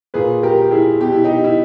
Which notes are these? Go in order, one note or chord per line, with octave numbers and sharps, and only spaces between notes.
A#2 G#4 B4
G4 A#4
G4
E4 G#4
B2 G4
E4
D#4 G4
E4